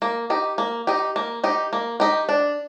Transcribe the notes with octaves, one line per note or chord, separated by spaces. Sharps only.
A#3
D#4 G4
A#3
D#4 G4
A#3
D#4 G4
A#3
D#4 G4
D4